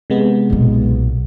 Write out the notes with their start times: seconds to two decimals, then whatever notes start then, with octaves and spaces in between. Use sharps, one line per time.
0.10 C3 G#3 B3
0.50 B1 A#2